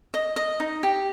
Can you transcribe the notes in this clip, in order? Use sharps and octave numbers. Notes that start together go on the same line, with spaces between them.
D#5
D#5
D#4
G4